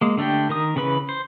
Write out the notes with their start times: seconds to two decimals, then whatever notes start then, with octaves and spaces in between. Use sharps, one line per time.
0.01 G#3 A#3
0.18 D3 A3 D4 G4 G5
0.49 D#3 A#4 D#6
0.76 C#3 E3 B4 B5
1.09 C5